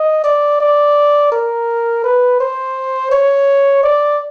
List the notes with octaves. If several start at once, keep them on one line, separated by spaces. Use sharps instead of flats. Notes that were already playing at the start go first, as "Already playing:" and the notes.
Already playing: D#5
D5
D5
A#4
B4
C5
C#5
D5